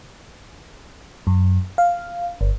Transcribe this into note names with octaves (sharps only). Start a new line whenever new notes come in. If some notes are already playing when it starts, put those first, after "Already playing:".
F#2
F5
G1